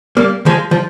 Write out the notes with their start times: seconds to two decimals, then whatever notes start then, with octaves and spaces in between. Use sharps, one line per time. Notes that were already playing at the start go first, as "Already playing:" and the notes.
0.17 G3 A#3
0.46 F3 G#3
0.71 F3